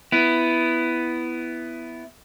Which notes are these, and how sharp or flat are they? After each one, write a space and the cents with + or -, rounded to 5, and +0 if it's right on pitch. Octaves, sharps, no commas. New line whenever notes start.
B3 +10 E4 +5